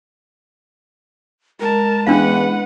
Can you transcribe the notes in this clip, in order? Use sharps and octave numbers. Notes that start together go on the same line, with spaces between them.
G#3 A#4 A5
E2 C#4 D4 B4 F5 F#5